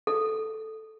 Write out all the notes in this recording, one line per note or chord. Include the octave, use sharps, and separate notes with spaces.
A4